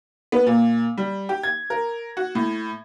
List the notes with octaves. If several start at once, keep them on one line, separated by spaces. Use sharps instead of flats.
B3
A#2
G3
G4
G#6
A#4
F#4
A2